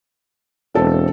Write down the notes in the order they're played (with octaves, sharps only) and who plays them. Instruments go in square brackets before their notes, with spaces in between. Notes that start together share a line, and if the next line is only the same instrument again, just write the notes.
[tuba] E1 [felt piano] C4 A4